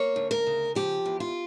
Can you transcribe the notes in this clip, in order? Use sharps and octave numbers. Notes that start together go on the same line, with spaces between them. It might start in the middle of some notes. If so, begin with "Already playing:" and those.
Already playing: A#3 C#5
D2
A#4
C#3
F3 G4
E2
F4